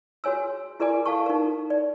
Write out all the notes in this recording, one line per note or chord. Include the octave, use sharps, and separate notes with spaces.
F#4 G#4 C#5 G#5 E6
E4 G#4 A#4 D5 G#5 D6
A4 F5 F#5 A5 C#6
D#4 A#4
D5